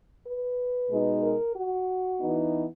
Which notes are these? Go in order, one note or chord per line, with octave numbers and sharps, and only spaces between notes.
B4
B2 G#3 D#4
A#4
F#4
E3 B3 D#4